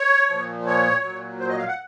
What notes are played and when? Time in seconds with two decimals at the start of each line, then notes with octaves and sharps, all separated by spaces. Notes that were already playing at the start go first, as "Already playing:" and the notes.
Already playing: C#5
0.29 A#2 F3
0.67 C#5
1.03 A#2 F#3
1.40 C5
1.49 D#5
1.58 F5
1.68 F#5